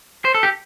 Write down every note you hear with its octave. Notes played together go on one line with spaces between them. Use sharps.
C5
A4
G4